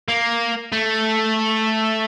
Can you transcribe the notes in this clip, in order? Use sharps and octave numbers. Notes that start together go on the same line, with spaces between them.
A#3
A3